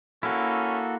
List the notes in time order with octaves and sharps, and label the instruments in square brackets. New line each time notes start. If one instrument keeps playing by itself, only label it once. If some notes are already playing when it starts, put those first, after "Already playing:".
[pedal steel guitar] A#3 E4 [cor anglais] C#4 [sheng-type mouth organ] F#4 A4